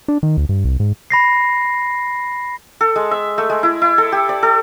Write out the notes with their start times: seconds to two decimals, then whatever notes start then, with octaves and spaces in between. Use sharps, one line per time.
0.08 D4
0.23 D#3
0.37 D2
0.49 G2
0.65 C2
0.80 G#2
1.10 B5 A#6 C7
2.81 A4
2.96 G#3
3.11 E5
3.38 A3
3.50 G#3
3.63 E4
3.82 E4
3.98 A4
4.12 G4
4.29 D5
4.43 A4